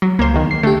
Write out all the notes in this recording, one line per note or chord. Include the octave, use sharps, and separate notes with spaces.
F#3
C#2 A#3 C5
E2 D#3
C7
D3 A3 G4